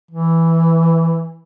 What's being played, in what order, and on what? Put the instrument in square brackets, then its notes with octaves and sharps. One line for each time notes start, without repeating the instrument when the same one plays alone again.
[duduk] E3